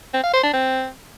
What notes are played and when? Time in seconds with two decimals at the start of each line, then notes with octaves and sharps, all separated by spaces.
0.14 C4
0.24 F5
0.33 C5
0.43 D4
0.53 C4